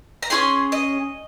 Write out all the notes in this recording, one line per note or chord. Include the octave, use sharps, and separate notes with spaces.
A#5
C#4 F4 G#4 C6
D#5